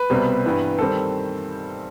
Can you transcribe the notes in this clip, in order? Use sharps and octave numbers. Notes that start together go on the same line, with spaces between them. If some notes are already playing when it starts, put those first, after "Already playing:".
Already playing: B4
C2 B2 G3 C4
G2 E3 B3
D#3 G3 C4 A4